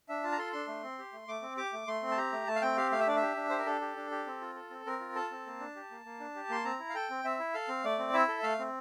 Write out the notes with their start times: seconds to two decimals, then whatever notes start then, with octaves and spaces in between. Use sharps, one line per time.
0.09 D4 E5
0.23 F4 A5
0.32 A#5
0.38 A4 C6
0.53 D4 C6
0.68 A3
0.83 C4
0.98 G4
1.13 A3
1.28 A3 D6
1.42 C4
1.57 G4 D6
1.73 A3
1.87 A3 C6
2.03 C4
2.12 A5
2.17 G4 A#5
2.33 A3
2.47 A3 A5
2.56 F5
2.61 C4 G5
2.77 G4 F5
2.92 A3 F5
2.99 E5
3.07 D4 D5
3.16 E5
3.22 G4
3.37 D4
3.49 G4 C5
3.58 A#4
3.66 D4 A4
3.81 G4
3.96 D4
4.11 G4
4.26 C4
4.41 F4
4.55 A4
4.70 C4
4.86 C4 A#4
5.00 F4
5.15 A4 A5
5.31 C4
5.46 A#3
5.60 D4
5.76 G4
5.91 A#3
6.05 A#3
6.20 D4
6.35 G4
6.50 A#3 C6
6.65 C4 A#5
6.80 E4
6.89 F5
6.94 A4 G5
7.10 C4
7.24 C4 E5
7.39 E4
7.54 A4 F5
7.69 C4
7.84 A3 D5
7.99 C4
8.13 E4 E5
8.28 A4
8.43 A3 F5
8.59 C4